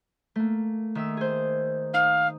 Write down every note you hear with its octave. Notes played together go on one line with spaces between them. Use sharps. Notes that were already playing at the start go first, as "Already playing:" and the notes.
A3 A#3
D#3 E5 E6
G#4 C5
D#4 F5